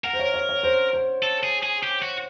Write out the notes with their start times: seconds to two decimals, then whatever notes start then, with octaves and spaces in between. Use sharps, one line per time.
0.04 A#4 F#5
0.13 C5
0.19 C#5
0.34 C#5
0.49 C#5
0.63 C5
0.93 C5
1.23 A4
1.43 G#4
1.63 G#4
1.83 G4
2.02 F#4